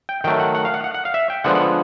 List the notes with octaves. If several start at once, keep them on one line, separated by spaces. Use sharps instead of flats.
G5
D#3 F#3 A3 G5
F#5
F#5
F5
F#5
F#5
F#5
F5
E5
G5
D3 F3 G#3 B3 F#5
F#5